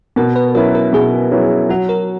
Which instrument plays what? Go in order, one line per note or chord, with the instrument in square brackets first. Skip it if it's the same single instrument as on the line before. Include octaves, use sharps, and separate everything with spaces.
[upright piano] B2 [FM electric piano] A#4
[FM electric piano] B4
[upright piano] F#3 C#4 E4 B4 [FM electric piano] A#4
[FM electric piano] A#4
[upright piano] B2 [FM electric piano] G#4
[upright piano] F#3 C#4 E4 B4
[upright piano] F#3 [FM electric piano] F#4
[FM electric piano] A#4